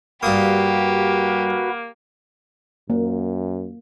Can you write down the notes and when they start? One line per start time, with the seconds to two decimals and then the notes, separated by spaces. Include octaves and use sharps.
0.23 G2 A#3 F#4 G4 B4 F5 D#6
2.90 F#2 A#3